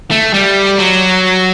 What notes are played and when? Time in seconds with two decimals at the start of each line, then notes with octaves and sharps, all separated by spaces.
0.11 A3
0.34 G3
0.78 F#3